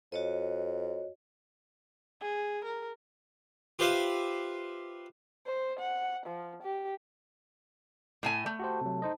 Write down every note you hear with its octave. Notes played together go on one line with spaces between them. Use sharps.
F2 F#4 C#5 D#5
G#4
A#4
F4 G4 B4 C5 E5 F5
C5
F#5
F3
G4
A2 A3 G#5
A3
F#4 G4 C5
C3 F#3
D#4 C5 D#5